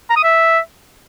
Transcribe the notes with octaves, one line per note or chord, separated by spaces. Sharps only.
A#5
D#6
E5